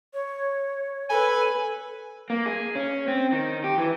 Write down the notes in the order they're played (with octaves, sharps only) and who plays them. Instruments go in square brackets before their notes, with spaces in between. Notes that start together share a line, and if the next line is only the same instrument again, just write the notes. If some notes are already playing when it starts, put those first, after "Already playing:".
[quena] C#5
[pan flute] A4 [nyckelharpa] B4 [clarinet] G#5
[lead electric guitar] A#3
G#4
C#4
C4
D#3
G4
E3